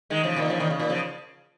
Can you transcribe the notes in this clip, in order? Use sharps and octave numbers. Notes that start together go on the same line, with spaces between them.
D#3 G#3
C#3 F3
A#2 D#3
C#3 F3
A#2 D#3
C#3
A#2
C#3 F3